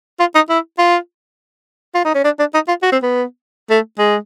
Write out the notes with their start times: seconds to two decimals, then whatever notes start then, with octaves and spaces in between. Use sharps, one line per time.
0.20 F4
0.35 D#4
0.49 E4
0.78 F4
1.95 F4
2.05 D#4
2.15 C#4
2.24 D4
2.39 D4
2.54 D#4
2.68 F4
2.83 F#4
2.92 C4
3.02 B3
3.70 A3
3.99 G#3